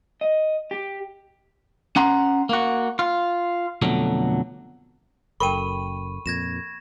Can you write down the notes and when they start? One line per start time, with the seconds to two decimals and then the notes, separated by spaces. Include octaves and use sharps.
0.21 D#5
0.71 G4
1.96 C#4 F#5 A#5 C6
2.49 A#3 F#4
2.99 F4
3.82 F2 B2 D3 F#3 A3
5.40 F#1 F#2 A4 A#4 G5 B5 C#6 D#7
6.26 F2 A#2 G#6 A#6 E7